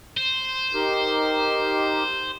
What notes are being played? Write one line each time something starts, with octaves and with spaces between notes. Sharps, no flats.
C5
D#4 G4 A#4